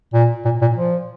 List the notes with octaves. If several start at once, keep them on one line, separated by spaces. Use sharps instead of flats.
A#2
A#2
A#2
F3